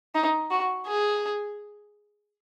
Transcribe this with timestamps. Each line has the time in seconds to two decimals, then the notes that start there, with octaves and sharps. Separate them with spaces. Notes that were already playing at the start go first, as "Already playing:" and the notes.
0.15 D#4
0.51 F#4
0.86 G#4